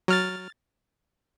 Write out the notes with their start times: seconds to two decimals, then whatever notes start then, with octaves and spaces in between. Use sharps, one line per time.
0.08 F#3 F6 A6